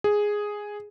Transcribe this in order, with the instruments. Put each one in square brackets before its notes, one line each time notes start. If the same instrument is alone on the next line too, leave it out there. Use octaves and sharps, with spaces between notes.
[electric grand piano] G#4